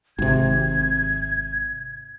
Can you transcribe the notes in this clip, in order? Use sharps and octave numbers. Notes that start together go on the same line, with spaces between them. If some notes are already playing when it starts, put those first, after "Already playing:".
G#1 C3 G#6